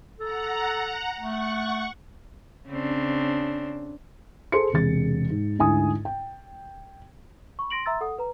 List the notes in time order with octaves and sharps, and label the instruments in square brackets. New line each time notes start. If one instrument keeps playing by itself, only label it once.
[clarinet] A4 [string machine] F#5 A#5
[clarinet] A3 [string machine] F#5 C#6
[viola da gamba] C#3 C4 D4
[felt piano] G#4 A4 C5 C6 C#7
E1 C3 G#4 A6
G#2
D2 G#2 E4 G#5 D#6
G5
[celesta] B5 C#6
C6 A#6 D7 F#7
E5 A#5 C6 E6 A6
A4 F#5 D#6
B4 A#5